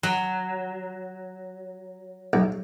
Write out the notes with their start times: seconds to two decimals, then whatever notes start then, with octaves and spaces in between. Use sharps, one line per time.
0.03 F#3
2.33 B1